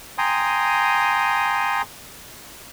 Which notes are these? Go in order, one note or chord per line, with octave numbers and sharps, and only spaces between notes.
G5 G#5 A#5 C6 D#6